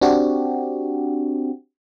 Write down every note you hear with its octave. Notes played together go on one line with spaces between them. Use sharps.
C4 D4 F#4 G4